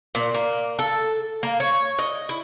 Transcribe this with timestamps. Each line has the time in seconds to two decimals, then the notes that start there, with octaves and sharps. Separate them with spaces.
0.15 A#2
0.34 A#3
0.79 A4
1.43 A#3
1.60 C#5
1.99 D#5
2.29 E4